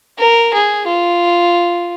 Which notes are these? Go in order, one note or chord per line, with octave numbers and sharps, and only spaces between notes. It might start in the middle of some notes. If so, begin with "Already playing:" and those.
A#4
G#4
F4